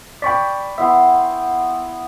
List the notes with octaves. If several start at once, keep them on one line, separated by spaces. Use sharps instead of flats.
D5 G5 B5 C#6 B6
B3 E4 E5 C6